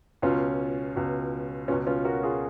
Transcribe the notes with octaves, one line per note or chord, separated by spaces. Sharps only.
C#2 B2 C#4 F4
C#2 B2
C#2 B2 C#4 F4
C#4 F4
F#4 A#4
F4 G#4